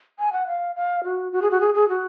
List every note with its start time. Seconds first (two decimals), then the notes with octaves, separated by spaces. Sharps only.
0.19 G#5
0.33 F#5
0.47 F5
0.76 F5
1.04 F#4
1.32 F#4
1.42 G#4
1.51 F#4
1.60 G#4
1.74 G#4
1.89 F#4